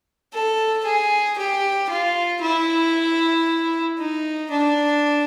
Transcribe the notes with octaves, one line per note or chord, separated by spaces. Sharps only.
A4
G#4
G4
F4
E4
D#4
D4